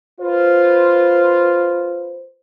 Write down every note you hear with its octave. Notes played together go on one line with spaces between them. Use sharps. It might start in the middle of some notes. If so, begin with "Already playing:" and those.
F4 B4 C5